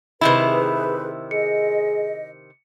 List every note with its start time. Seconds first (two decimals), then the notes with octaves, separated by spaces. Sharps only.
0.21 C3 D#3 E4 G#4 B4 B5
1.31 G#4 D#5 C#7